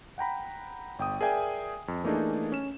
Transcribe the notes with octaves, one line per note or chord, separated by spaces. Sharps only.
F#5 G5 A#5 B5
G1 G5 D#6
G#4 A#4 D5 E5 G5 G#5
F2
E3 A3 A#3 D4 D#4 G#4
C#4 E7